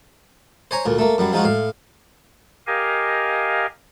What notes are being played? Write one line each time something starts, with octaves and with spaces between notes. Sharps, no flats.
C5 C#5 G#5 A#5
D2 A#2
A3 A#3
F#2 F#3 G3
F3 G#3 D#4 F4 F#4
A2 F5
G4 A#4 D#5 F5 G#5